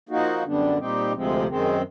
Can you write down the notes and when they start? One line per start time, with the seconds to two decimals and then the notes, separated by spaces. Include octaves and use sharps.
0.09 F3 A#3 D#4 F#4
0.44 F#2 D3 G3 B3 D4
0.78 A#2 G3 C4 D#4 G4
1.12 D2 C3 F3 G#3 C4
1.47 F#2 D#3 G#3 C4